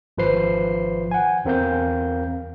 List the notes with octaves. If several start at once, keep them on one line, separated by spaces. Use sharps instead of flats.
G#1 F3 B4 C5 C7
F#5 G#5
E2 C4 A#4 F5 G6